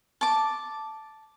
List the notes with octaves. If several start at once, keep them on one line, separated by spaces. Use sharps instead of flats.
A5 D6